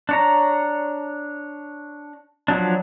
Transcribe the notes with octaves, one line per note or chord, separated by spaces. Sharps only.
D4 C#5 A#5
F3 F#3 D4